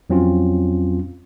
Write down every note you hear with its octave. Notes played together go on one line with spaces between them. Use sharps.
F2 F#3 C4 C#4 F4